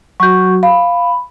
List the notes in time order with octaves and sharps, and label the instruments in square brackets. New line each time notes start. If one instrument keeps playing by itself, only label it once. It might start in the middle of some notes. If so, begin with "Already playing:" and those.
[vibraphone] F#3 F#4 [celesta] C#6 G6
[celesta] F5 [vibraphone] B5